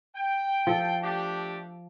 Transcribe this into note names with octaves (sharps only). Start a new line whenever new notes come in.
G5
F3 A4
A3 D4 G4